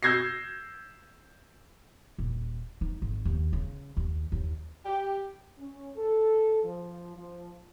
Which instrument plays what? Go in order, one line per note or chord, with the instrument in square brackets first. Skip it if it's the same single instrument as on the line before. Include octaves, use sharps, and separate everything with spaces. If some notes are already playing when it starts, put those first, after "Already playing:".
[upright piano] E6 G6 G#6 A#6 C7
[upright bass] D#1
D#4
G#1
D#2
C#3
D#2
D#2
[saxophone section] G4
[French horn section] C#4
A4
F3
F3